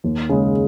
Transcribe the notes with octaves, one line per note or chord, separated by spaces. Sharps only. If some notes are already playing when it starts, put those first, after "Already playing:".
D#2
C#3 G#3